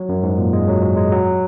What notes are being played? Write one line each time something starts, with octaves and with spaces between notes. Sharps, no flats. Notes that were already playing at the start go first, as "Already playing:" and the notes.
Already playing: F#3
F#2
G#2
A#2
G#3
F#3
F#3
G#3
F#3